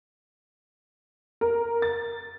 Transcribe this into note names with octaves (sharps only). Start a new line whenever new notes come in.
A#4
A6